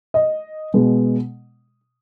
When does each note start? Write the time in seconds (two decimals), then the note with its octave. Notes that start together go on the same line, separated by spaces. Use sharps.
0.14 D#5
0.74 B2 G#3 B3